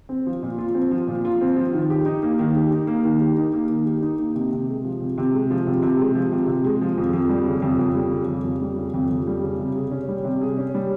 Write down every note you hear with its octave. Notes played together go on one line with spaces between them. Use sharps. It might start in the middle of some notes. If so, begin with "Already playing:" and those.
C4
F3
A#2
F4
C4
F3
A#2
F4
C4
F3
D#3
G4
D#4
A#3
D#3
G4
D#4
A#3
D#3
G4
D#4
A#3
D#3
G4
D#4
A#3
C3
C3
G#3
F3
C3
C3
G#3
F3
C3
C3
G#3
F3
C3
C3
G#3
F3
F2
F2
G3
C#3
F2
F2
G3
C#3
F2
F2
G3
C#3
F2
F2
G3
C#3
C3
G#4
C#4
G3
C3
G#4
C#4
G3